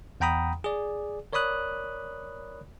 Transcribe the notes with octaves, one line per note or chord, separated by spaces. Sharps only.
E2 F#5 G5 A#5 B5 D#6
G#4 D5
A#4 C#5 D5 B5 D#6 F#6